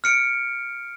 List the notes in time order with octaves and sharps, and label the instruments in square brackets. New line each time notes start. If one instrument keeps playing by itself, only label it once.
[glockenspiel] F6 C#7 D7